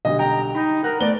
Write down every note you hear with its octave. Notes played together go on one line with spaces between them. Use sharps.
B1 D3 G3 D#5
G5 A#5
D#4 B5
A#4 F#5 A#5 F#6
A3 B3 D5 G7